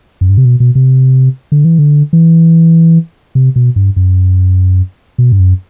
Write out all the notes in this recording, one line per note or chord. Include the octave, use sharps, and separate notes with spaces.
F#2
G2
C3
B2
B2
C3
D3
E3
D3
E3
C3
B2
G2
F#2
B2
G2
F#2